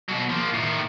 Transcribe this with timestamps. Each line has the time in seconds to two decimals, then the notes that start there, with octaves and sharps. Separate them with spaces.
0.09 B2 F#3
0.29 F3 A#3
0.55 A2 D#3